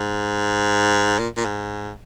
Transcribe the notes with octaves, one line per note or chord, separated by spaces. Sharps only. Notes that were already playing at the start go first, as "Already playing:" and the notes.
Already playing: G#2
A#2
A#2
G#2